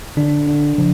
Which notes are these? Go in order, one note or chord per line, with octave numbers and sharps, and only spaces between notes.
D3 D4
D4
C#3 F3